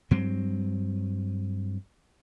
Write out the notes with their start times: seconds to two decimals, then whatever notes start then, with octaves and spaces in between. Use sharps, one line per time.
0.11 G2 F#3 C4